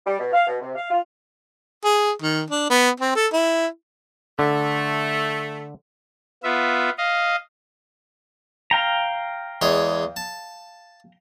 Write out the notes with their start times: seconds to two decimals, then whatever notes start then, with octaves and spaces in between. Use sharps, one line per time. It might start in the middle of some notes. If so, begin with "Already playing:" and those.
0.06 G3
0.19 B2
0.32 F5
0.47 B2
0.61 C3
0.75 F5
0.90 F4
1.84 G#4
2.22 D#3
2.50 D4
2.70 B3
3.00 C4
3.15 A4
3.33 E4
4.39 D3 A3
6.44 B3 F4 E5
6.98 D#5 F5
8.71 F5 G5 A#5
9.62 E2 G#3 C#5
10.16 A5